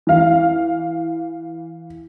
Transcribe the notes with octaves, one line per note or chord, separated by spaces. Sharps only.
E3 F5